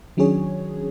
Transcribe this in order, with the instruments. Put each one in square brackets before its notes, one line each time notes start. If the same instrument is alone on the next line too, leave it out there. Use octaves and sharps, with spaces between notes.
[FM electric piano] D#3 F#3 C#4 D4 G#4 C#5